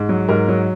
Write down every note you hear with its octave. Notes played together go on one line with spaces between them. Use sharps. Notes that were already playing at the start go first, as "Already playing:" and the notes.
Already playing: G#2
F#3
G#2 A#4
F#3